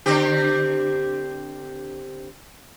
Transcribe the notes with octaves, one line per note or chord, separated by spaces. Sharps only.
D3 C4 G4